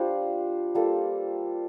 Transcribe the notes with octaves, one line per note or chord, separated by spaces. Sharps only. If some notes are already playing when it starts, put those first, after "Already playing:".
Already playing: G3 D4 F4 C5
G3 A#3 F4 A4